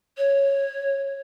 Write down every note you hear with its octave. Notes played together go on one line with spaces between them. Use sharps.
C#5